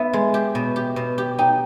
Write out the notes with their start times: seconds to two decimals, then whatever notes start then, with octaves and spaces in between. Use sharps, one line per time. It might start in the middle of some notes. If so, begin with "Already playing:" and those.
Already playing: B3 E5
0.13 G#3
0.34 G4
0.55 B2
0.76 G4
0.96 B2
1.18 G4
1.39 D#4 G5